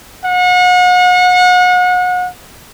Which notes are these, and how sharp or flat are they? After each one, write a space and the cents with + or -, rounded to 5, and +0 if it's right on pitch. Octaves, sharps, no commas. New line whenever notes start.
F#5 -35